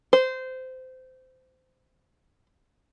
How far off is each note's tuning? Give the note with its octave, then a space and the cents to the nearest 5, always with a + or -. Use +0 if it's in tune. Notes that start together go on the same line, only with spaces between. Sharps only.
C5 -20